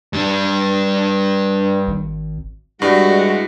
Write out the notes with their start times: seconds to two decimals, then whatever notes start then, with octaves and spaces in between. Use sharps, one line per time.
0.13 G2 G3
1.87 G#1
2.82 G2 G3 G#3 E4 F#4